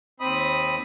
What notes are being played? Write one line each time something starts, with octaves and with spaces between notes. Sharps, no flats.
D#2 C4 B5 D#6